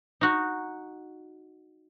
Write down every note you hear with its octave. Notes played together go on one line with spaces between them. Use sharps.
D#4 F#4